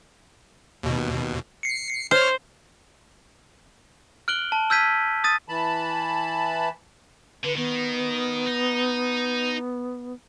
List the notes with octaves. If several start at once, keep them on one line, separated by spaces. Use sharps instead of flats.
D#2 B2
C7 C#7
C5 C#5 F6
F6 F#6 D7 F#7 G7
A5
E6 F6 G6 G#6 B6 D#7
D#6 A6 D#7
E3 A5 B5
D3 B4
D#3 B3
D#4